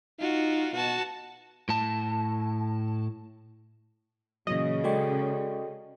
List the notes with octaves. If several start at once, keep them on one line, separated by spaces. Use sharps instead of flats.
D#4 F4 F#4
B2 F#4 A5
A2 A5
A#2 C#3 E3 F#3 D#5
G#3 F#4 A4 D5 G5 C#6